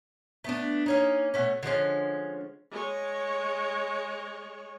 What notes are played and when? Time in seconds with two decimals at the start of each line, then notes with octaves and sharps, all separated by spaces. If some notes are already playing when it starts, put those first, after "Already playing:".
0.44 A3 B3 D4
0.86 A#3 C#4 D#4
1.34 B2 A3 C#4
1.63 D3 F3 G#3 C#4
2.71 G#3 C#5